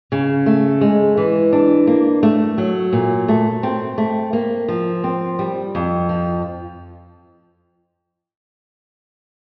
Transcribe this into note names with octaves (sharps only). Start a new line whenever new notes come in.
C#3
A3
G#3
E3
D4
A#3
A3
F#3
A#2
A3
C4
A3
A#3
F3
C4
G3
F2
F3